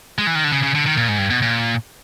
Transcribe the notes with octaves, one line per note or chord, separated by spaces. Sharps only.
G#3
E3
D#3
D3
C#3
C#3
D3
D#3
A#2
G#2
G2
B2
A#2